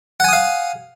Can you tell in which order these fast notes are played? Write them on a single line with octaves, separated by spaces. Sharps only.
F#5 G#5 D#6 F5